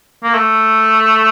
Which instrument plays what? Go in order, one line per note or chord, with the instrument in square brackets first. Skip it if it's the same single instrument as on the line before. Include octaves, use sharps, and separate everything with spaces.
[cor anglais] A#3
A3